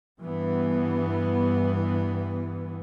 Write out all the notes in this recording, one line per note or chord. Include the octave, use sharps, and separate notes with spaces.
G2 E3 B3